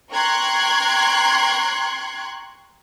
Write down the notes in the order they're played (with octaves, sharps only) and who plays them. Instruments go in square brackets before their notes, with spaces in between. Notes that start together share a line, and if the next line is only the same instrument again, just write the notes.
[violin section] G5 A#5 C6 C#6 F#6 G#6